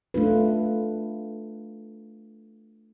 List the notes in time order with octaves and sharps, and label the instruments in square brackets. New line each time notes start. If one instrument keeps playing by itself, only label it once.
[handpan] A3 D4 F4 B4